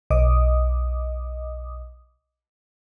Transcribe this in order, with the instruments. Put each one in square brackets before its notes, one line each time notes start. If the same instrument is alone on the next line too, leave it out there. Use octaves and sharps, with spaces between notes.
[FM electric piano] B1 D#5 D6 D#6